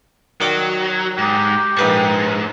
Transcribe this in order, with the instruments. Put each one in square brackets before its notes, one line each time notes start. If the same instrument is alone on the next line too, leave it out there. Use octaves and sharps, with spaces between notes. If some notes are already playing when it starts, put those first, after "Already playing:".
[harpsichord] D#3 D5 G5 [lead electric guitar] F#3
[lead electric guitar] G#2 [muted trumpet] G4
[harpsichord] A#1 B4 C#6 [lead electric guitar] G#2